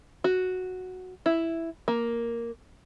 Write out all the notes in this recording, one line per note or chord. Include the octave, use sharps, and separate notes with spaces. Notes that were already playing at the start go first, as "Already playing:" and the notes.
F#4
E4
A#3